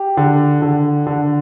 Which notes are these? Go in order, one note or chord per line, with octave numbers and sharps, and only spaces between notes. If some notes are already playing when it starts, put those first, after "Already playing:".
Already playing: G4
D3
D3
D3